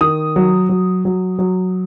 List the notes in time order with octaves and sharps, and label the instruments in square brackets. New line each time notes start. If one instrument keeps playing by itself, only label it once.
[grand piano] D#3 D#6
F#3
F#3
F#3
F#3